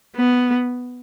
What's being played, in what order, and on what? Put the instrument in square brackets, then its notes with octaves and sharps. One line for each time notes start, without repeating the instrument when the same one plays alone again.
[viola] B3